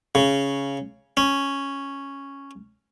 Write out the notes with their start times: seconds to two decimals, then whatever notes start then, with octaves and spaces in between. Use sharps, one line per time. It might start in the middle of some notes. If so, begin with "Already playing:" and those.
0.15 C#3
1.17 C#4